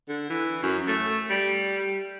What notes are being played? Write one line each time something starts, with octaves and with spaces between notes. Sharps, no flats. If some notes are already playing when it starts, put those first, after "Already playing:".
D3
E3
F#2
A3
G3